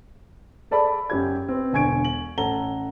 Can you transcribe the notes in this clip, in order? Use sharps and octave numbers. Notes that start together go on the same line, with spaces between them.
G#4 A4 D5 A5 B5
F#2 G4 G#6
C4 B4
E1 D3 G#5 C#6 G#6 D7
F#7
A1 A4 F#5 A#5 G7